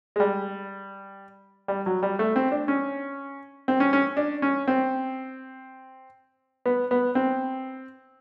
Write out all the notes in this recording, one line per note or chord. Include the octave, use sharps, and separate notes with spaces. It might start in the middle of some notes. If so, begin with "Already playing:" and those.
G#3
G3
G3
F#3
G3
A3
C4
D4
C#4
C4
C#4
C#4
D4
C#4
C4
B3
B3
C4